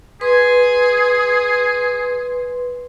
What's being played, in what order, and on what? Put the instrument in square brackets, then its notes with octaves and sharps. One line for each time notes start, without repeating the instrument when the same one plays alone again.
[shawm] G#4 [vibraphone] B4 C6